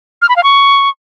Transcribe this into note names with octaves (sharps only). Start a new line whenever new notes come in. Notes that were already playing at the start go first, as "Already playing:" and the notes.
F6
B5
F5
C#6